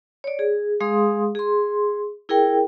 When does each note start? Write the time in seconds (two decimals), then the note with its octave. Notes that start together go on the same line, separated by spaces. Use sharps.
0.24 C#5 D5
0.39 G#4
0.80 G#3 G#4 F5 C6 D#6
1.35 G#4 C6
2.29 E4 G#4 A#4 G5